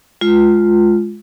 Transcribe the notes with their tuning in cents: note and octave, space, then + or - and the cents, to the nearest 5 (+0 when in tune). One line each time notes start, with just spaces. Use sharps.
G#3 +20 F4 +0